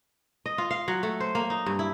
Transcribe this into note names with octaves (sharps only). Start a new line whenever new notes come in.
D#5
F4
F5
F#3
A3
C5
A#3
D#4
G2
E4